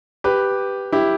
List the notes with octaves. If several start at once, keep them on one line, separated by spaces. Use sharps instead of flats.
G4 B4
E4 G4